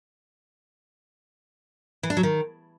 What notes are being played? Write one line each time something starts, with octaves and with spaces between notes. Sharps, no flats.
E3
D4
F#3
D#3